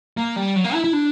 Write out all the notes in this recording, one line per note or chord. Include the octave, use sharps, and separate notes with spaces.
A#3
G3
F#3
A#3
E4
E4
D4